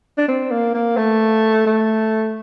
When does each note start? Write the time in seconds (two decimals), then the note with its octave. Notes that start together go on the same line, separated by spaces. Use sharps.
0.18 D4
0.28 C4
0.51 A#3
0.74 A#3
0.97 A3
1.66 A3